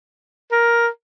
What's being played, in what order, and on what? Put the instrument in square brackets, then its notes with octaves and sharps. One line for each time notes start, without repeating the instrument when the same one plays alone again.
[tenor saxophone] A#4